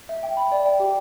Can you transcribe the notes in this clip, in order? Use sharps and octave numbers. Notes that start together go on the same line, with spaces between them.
E5
G5
B5
D5
G5
G4